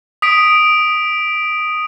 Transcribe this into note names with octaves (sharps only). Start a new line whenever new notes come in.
D#6 B6 D7